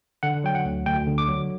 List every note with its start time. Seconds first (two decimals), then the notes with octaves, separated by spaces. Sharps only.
0.23 D3 F#5
0.44 F#3 G5
0.55 F#5
0.65 D2
0.86 D2 G5
1.07 D3
1.18 D6
1.28 F#3